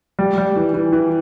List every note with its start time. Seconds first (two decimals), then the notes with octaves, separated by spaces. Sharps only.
0.19 G3
0.38 G3
0.56 E3
0.74 E3
0.93 E3